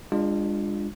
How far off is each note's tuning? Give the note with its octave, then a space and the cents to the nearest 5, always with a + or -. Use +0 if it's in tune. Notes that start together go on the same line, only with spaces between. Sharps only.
G#3 -25 D4 +10 F4 +0